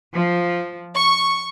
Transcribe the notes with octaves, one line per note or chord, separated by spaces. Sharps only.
F3
C#6